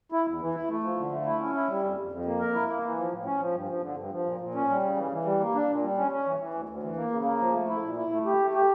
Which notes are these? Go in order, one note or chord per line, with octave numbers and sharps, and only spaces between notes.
E4
E2
E3
E4
A3
F3
D3
A3
E4
C#4
E4
G3
F2
F2
F2
A#3
A#4
E4
A#3
E3
F3
A2
C#4
F3
G2
F3
D3
G2
F3
A#2
A#2
C#4
G3
C#3
E3
E3
G3
A#3
D4
A#2
G3
C#4
C#4
E3
E3
D2
D2
E3
A#3
C#3
A#3
F3
A3
E4
A#2
E4
A3
G4
A3
G4